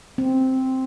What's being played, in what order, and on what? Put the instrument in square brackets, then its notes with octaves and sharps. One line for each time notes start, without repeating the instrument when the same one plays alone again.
[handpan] C4